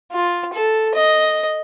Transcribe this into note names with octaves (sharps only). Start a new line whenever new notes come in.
F4
A4
D#5